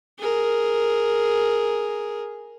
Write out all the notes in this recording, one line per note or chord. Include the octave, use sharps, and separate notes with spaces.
G#4 A#4